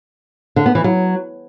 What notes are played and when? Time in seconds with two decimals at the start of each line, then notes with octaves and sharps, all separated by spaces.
0.56 D3
0.66 B3
0.75 E3
0.84 F#3